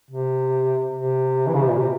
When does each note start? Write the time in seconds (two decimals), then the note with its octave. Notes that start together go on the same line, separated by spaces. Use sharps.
0.11 C3
0.95 C3
1.47 E3
1.55 C#3
1.63 C3
1.70 A#2
1.79 C3